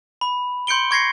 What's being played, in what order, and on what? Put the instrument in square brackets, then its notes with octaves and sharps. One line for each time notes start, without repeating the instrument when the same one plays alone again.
[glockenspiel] B5
C6 G6 C#7 D7 G7
C#6 G#6 A#6 C7 C#7